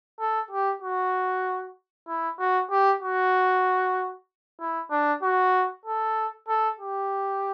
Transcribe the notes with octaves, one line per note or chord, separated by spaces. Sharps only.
A4
G4
F#4
E4
F#4
G4
F#4
E4
D4
F#4
A4
A4
G4